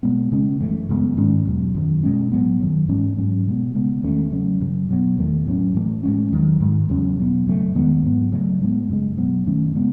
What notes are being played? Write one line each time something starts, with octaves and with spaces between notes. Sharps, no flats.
B2 G#3 B3
C#3 G#3 C#4
F#2 E3 A3
F#2 C#3 G#3 B3
G#2 D#3 G#3 C#4
E2 B2 F#3
F#2 D#3 F#3
B2 G#3 C#4
A2 F#3 B3
F#2 D#3 F#3
G#2 E3 G#3 C#4
G#2 F#3 C#4
B2 G#3 B3
C#3 G#3 B3
E2 D#3 A3 C#4
C#3 F#3 C#4
F#2 C#3 F#3
B2 F#3 B3
E2 D#3 A3
A2 F#3 A3 C#4
A2 E3 A3
A2 G#3 C#4
E2 D#3 F#3
G#2 D#3 G#3
E2 C#3 F#3 C#4
B2 F#3 B3
F#2 C#3 F#3 A3
E2 D#3 G#3 B3
G#2 F#3 B3
C#3 F#3 A3
A2 G#3 B3
F#2 C#3 G#3
B2 F#3 B3
F#2 D#3 A3 C#4
C#3 G#3 B3